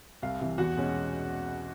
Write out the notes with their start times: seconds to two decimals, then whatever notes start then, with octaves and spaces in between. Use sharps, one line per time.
0.22 C2 F5
0.41 C3 E3
0.58 E2 F#4 F#5
0.76 B2 G#3 C#4